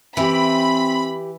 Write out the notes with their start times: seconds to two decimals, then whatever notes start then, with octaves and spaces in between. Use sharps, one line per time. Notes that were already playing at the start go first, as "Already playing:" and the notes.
0.17 E3 C4 G4 G5 B5